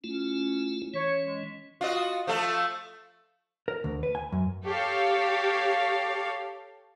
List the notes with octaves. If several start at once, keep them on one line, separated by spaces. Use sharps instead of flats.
A3 C#4 E4 F4
E3 C#4 C#5
G#3
F4 F#4 D#5
F3 A3 A4
A#4
D2
B4
G#5
F#2
G4 A4 C#5 F5